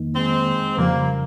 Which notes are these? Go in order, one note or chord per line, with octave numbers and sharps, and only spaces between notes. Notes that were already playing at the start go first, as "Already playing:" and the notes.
Already playing: F2 D#3 A#3 D#4
G#3 C4
F2 C#3 F3 G3 A#3